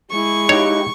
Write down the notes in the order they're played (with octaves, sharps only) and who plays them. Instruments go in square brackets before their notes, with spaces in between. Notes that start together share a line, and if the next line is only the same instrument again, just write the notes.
[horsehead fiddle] G#3 E4 [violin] C#6
[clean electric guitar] D#4 G4 [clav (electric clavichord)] C#5